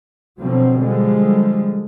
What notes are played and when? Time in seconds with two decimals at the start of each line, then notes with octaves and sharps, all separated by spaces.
0.40 B2 D3 F3 F#3 C4
0.77 D3 F3 G3 G#3